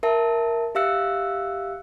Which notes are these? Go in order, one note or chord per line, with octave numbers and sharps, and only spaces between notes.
A#4 E5 A5
G4 E5 F5 E6 F#6 C#7